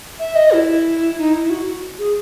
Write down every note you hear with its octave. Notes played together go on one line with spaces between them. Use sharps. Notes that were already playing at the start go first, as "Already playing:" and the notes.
E5
D#5
E4
D#4
E4
F#4
F#4
G#4